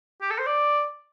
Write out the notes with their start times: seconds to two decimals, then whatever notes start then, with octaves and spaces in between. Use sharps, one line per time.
0.22 G4
0.31 A4
0.39 C5
0.47 D5